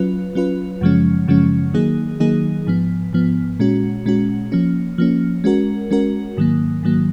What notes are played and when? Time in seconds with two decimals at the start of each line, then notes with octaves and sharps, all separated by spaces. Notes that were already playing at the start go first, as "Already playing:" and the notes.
Already playing: F#3 C#4 F4 B4
0.35 F#3 C#4 F4 B4
0.81 F#2 C#3 F3 G#3 C#4
1.28 F#2 C#3 F3 G#3 C#4
1.74 D#3 F#3 A#3 D#4 G#4
2.20 D#3 F#3 A#3 D#4 G#4
2.67 G#2 F3 B3
3.13 G#2 F3 B3
3.59 A#2 G#3 C#4 F#4
4.06 A#2 G#3 C#4 F#4
4.52 F3 A#3 C#4
4.98 F3 A#3 C#4
5.44 G#3 C#4 F#4 A#4
5.91 G#3 C#4 F#4 A#4
6.37 G#2 D#3 F#3 A#3
6.83 G#2 D#3 F#3 A#3